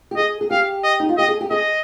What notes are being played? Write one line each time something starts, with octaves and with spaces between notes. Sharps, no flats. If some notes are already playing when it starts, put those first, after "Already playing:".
G4
G#4 D#5
G#4
G4 F5
D#5
D#4
F4
G4 D#5
G#4
G4
G#4 D#5